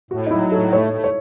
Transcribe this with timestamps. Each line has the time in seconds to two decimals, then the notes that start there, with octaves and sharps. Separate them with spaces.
0.11 A2 F#4
0.27 D#4
0.31 F#3 E4
0.52 A2 A4
0.73 A3 C#5
0.93 A3
1.04 C#5